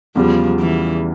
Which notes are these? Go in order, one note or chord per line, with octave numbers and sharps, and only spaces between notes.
E2 C#3 F3 G3
E3